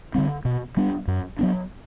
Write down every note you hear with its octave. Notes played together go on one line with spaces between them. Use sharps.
D3 G3 C4
B2
G3 B3 D4
F#2
F#3 B3 D4